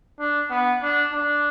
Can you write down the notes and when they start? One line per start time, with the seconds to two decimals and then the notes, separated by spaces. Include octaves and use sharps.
0.20 D4
0.50 B3
0.82 D4
1.13 D4